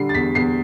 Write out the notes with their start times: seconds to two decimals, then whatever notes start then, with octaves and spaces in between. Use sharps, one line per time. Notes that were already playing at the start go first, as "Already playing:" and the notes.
Already playing: D3 G3 C7
0.09 A6
0.14 E2 B6
0.35 E2 C7